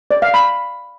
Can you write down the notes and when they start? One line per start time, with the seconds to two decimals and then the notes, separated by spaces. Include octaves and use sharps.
0.11 D5
0.22 F5
0.34 B5